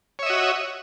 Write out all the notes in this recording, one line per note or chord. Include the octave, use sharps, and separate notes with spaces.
F#4 C#5 D#5 E5